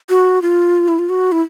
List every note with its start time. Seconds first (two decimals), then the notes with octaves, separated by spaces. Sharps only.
0.09 F#4
0.42 F4
0.88 E4
0.99 F4
1.09 F#4
1.32 E4